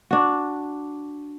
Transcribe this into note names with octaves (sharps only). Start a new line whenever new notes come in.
D4 F#4